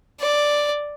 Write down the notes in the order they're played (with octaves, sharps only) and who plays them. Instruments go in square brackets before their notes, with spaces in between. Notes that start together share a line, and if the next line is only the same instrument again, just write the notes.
[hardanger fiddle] D5